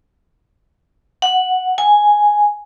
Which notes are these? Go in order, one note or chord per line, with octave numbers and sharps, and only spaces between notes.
F#5
G#5